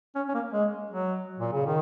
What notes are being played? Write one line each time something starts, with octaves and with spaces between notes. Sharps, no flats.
C#4
C#4
A#3
G#3
F#3
A#2
C#3
D#3